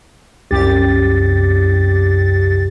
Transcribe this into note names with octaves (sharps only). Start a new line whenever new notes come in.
C2 F#2 G4 A6